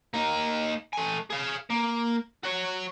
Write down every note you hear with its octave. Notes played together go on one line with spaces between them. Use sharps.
A#3 D#4
A3 G#5
G#4 F5
A#3
F#4 C#5